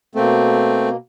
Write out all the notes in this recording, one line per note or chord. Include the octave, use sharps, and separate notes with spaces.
B2 A3 A#3 C4